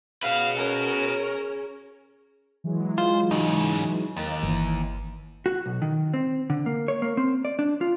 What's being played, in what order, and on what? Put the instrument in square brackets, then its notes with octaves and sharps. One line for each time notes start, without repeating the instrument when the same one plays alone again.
[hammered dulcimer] C#3 [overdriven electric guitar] F#4 B4 [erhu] F5
[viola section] C#4 [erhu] A#4
[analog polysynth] E3 F#3 G#3
[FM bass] F4 [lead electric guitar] C5
[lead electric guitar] G#2 C#3 [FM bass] D#4
[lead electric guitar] D#2 [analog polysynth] A#3 D#5 A6
[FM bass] G1 [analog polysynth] E3
[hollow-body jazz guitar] F#4
B1
D#3
C4
D3
A#3
C#5
A#3
C4
D5
D4
F4